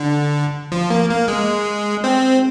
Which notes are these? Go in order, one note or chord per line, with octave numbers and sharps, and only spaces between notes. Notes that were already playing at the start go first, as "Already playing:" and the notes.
Already playing: D3
F3
A#3
A#3
G#3
C4